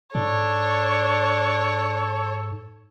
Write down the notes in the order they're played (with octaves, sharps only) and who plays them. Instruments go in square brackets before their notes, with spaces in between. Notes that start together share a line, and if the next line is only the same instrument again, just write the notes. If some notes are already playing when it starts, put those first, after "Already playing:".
[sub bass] G#2 [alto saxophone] D4 [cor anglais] A4 [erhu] C#5